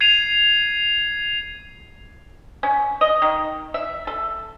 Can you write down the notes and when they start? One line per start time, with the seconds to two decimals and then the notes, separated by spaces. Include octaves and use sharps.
0.01 G#6 C7 D#7 F7
2.63 C#4
3.01 D#5
3.22 D#3
3.74 E5
4.07 A4